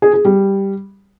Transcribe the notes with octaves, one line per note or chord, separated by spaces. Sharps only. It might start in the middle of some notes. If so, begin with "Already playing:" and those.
G#4
G#4
G3